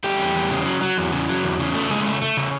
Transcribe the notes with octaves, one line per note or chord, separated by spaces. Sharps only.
G3 A3 G4
E2
E2
C#3
F#3
F#3
E2
C#3
F#3
E2
C#3
A3
C#3 G#3 G#4
A3
A3
C#3